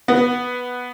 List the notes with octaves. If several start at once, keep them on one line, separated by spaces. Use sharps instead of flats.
B3